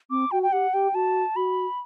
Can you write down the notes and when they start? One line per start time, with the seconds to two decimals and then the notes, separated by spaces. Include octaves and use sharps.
0.10 C4 D6
0.31 F#4 G5
0.43 G5
0.52 G4 F#5
0.73 G4 G5
0.94 F#4 A5
1.36 F#4 B5